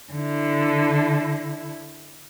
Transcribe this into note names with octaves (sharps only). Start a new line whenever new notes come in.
D3 E4